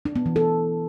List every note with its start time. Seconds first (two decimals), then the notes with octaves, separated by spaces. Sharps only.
0.05 D4
0.16 B3
0.26 E3
0.36 A4